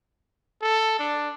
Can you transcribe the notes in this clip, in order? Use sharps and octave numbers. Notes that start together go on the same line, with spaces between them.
A4
D4